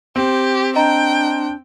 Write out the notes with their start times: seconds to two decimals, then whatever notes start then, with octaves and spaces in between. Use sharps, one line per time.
0.16 C4 G4
0.76 D4 D#5 G5 A#5